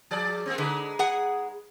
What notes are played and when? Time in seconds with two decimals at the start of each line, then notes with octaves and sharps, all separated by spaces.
0.11 F3 G#4 D5
0.46 G#3 A#3 C4
0.58 D3 G#3 D#4 B4
0.99 G#4 F#5